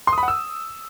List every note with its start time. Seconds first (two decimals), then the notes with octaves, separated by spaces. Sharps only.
0.07 C6
0.13 D#6
0.18 B5
0.23 F#5
0.28 E6